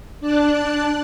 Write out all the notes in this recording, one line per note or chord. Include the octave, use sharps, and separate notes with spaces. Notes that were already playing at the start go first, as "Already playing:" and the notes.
D4 D5 A5 F#6